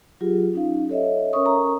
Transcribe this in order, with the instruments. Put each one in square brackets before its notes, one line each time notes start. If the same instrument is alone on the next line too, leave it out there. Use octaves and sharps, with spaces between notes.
[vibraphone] F#3 F4 G4 G#4
C#4 D#4 F5
A4 C#5 D#5 E5
C#4 A#4 C#5 E5 C#6 D#6
A#4 A#5 C#6